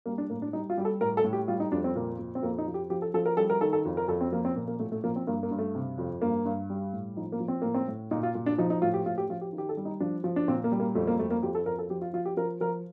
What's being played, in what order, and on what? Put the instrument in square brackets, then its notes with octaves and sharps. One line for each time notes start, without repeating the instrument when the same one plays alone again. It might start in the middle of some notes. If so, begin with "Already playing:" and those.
[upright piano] G3 A#3
D4
A2 A#3
D4
G3 D#4
F4
G3 G4
A4
A2 A#4
A4
A2
G4
G3 F4
D#4
F2 D4
C4
A#2 A#3
A#2
C4
F2 A#3
D#4
F3
G4
F3 G4
A4
F3 A4
A#4
G3 A4
A#4
D#3 A4
A4
F2
A#4
F2 A4
C4
F3 A#3
C4
A#2 A#3
A#3
A2 A3
A3
F3 A#3
C4
G2 A#3
A#3
G2
A3
C3
F2
G2 A#3
G2
G3
A2
F3 D#4
A#3
F3
C4
A2 A#3
C4
A2
A#2 D#4
F4
A#2
D4
F3 D#4
D#4
A2 F4
G4
A2 F4
G4
F3 F4
G4
D#3
G4
A4
G3
D#4
F3 D4
F3
D4
A#2 C4
A#3
G3
A#3
F2 A3
A#3
F2 A3
A#3
F2 G4
A4
F2 A#4
A4
F3 G4
F4
F3 F4
G4
F3 A#4
F3 A#4